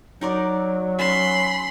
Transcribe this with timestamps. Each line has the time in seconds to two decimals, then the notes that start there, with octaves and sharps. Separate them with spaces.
0.21 F#3 D#4 A#4 D5
0.99 C#4 B5 C6